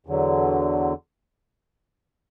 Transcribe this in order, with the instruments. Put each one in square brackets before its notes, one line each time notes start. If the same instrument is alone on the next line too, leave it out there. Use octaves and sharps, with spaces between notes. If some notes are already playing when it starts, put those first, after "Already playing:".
[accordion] E2 D3 F#3